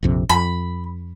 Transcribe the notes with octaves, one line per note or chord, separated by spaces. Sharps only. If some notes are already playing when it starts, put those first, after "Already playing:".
A#1 F2 C3
F2 B5